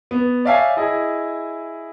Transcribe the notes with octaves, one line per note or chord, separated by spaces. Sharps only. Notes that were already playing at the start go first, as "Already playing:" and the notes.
B3
C#5 D5 E5 F5 G5 G#5
E4 G#4 D#5